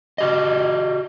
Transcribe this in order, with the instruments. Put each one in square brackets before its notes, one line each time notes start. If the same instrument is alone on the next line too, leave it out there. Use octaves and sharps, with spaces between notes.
[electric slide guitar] F#4 G4 D#5